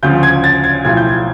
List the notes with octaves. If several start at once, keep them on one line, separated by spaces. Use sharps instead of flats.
D2 C#3 F3 G6
G#6
A6
G#6
B1 A2 F3 G#6
G6
G#6